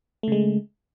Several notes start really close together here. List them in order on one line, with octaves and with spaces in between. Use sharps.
A3 C#3 G#3